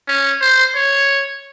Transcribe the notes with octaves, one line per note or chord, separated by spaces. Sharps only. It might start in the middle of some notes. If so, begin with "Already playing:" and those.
C#4
C5
C#5